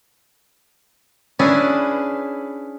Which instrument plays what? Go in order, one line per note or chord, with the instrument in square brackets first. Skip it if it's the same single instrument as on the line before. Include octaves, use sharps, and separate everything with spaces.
[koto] C#4 D4 E4 G#4 B4